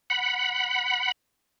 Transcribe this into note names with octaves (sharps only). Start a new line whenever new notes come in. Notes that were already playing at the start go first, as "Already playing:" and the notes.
F#5 B5